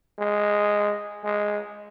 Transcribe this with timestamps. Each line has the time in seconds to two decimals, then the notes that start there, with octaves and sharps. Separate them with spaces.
0.19 G#3
1.24 G#3